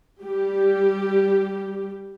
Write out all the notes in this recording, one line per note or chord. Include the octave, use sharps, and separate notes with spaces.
G3 G4